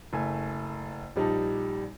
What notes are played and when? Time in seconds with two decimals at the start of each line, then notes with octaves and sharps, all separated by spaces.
0.13 F#1 A3 G#5
1.16 A#1 G3 D#4 A5